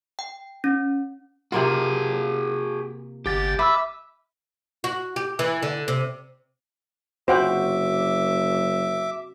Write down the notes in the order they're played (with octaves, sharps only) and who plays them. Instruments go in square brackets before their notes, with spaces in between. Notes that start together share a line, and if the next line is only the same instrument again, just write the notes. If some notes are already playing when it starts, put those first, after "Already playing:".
[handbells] G5
C#4
[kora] C3 A#3 F4 [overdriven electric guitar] F#4 G#4
[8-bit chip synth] G1 A6 [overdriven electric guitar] G4
[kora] B4 [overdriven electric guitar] E5 [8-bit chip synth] D6 E6
[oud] F#4
G4
E3
D3
C3
[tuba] F#1 [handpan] C4 F#4 [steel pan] C5 F#5 G5 [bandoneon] E5 D6